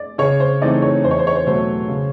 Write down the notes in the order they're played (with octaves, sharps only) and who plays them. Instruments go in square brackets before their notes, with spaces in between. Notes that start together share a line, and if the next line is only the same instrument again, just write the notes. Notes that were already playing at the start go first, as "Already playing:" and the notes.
Already playing: [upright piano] D5
[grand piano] C#3 [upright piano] C#5
[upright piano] C5
[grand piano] E3 A3 C4 D#4 [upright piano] D5
[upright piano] C#5
[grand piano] E2 [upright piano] C5
[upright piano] C#5
C5
C#5
C5
[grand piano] B2 F#3 A3 [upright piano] C5
[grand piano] C#3